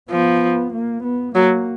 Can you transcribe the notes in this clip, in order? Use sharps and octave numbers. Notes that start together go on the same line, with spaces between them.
F3 B3
A#3
B3
F#3 A#3